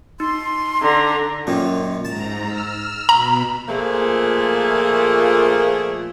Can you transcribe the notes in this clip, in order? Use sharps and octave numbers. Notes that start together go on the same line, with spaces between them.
D#4 C6
D3 A#5
F#2 A#2 D#3
G#2 A5 A#5
E6 F6
B2 A#5 B5
A#2 F3 A3 A#3 G#4